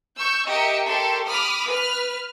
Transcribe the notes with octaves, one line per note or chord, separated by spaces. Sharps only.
C#6 E6 G6
G4 A#4 D#5 E5 C#7
G4 A4 A#4 C6 C#6
B5 D6 D#6 F6
B4 F6